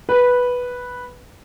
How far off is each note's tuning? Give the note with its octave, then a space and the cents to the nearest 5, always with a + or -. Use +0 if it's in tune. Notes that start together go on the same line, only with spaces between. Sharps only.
B4 -5